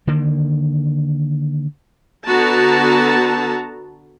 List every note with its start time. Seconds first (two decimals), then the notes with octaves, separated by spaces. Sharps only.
0.07 D3 D#3 A#3
2.25 D3 B3 F#4 A5 A#5